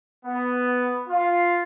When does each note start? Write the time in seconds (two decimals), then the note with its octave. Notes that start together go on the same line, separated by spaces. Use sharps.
0.25 B3
1.08 F4